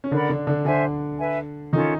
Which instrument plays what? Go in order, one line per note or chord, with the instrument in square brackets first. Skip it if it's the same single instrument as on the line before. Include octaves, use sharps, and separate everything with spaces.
[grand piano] C#4
[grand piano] D3 D4 [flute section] A#4 D5 F#5 B5
[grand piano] D3 D4
D3 D4
[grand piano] D3 D4 [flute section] C5 E5 G#5
[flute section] B4 E5 G#5
[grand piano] D#3 D#4 [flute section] C#4 F4 A4